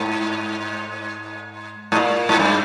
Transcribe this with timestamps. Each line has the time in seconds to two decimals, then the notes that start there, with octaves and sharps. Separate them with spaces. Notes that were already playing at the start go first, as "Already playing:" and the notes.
Already playing: G#2
1.92 G#2
1.97 A#2
2.29 G#2
2.39 G2